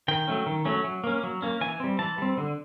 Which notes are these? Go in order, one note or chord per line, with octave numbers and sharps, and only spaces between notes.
D#3 G5
F#3 A3 C#4
D#3
F#3 A3 C#4
F#3
A#3 C#4
F#3
A#3 C#4
E3 G#5
G3 C4
E3 A5
G3 C4
D3